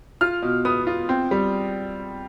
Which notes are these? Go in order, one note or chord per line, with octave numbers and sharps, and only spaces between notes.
F4 F6
B2
B3 D#6
F4
C4
G3